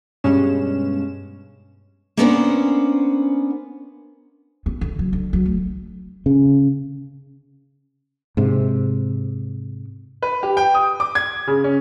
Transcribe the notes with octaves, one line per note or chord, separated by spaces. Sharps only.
G2 B2 G#3 C#4 E7
A#3 B3 C#4 D4 A#4 C5
B3
D3
F#3
D3
F#3
D2
C#3
G#2 C3
B4
G4
G5
D#6
D6
G#6
C#3
C#4